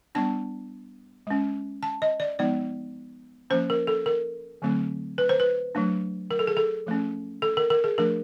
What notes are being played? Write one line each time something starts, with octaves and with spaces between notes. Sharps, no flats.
G3 B3 D4 A5
G#3 C#4
A5
D#5
D5
F3 G#3 B3 D#4 D5
F3 A#3 C#4 C5
A#4
A4
A#4
D3 F#3 A3 C4
B4
C5
B4
F#3 A3 D4
A#4
A4
G#4
A4
F3 A3 C#4
A4
A#4
A#4
G#4
F3 A3 D4 A#4